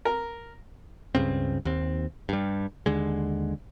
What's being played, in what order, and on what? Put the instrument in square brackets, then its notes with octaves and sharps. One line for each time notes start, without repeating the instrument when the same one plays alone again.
[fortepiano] A#4
[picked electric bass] C#2 G2 C#3 C4
D#2 C4
G2 G3
D#2 D3 G#3